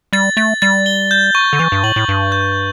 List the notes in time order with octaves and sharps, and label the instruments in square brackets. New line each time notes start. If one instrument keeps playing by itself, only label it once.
[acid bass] G3 [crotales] A6
[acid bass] A3 [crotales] A6
[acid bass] G3 [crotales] A6
[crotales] G7
G6
C#6
[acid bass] D3
[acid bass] E3 [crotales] C#6
[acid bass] G2
[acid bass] A2 [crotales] F#7
[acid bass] A2
[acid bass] G2 [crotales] F#7
[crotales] G6